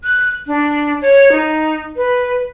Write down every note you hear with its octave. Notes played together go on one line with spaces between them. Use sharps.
F#6
D4
C#5
D#4
B4